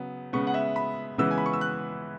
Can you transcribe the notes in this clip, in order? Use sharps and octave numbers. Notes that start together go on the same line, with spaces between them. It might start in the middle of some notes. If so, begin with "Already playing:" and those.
Already playing: C#3 F#3 B3
C#3 G#3 B3 C#6
F#5
E5
B5
C#3 E3 G#3 B3 E6
G#5
B5
C#6
E6
F#6